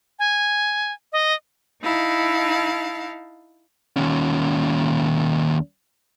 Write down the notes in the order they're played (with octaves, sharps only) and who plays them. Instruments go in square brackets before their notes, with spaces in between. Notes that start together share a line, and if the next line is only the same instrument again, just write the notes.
[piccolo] G#5
D#5
[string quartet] D#4 E4 F5 A5
[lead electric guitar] D#2 C#4